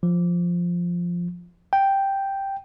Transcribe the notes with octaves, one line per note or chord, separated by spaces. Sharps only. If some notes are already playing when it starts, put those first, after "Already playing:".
F3
G5